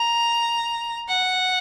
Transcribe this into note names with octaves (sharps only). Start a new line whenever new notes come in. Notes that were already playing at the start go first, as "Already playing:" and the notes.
Already playing: A#5
F#5